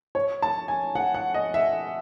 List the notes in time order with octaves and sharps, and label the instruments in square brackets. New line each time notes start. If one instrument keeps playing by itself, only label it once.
[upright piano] C#5
A5
G#5
F#5
F#5
D#5
E5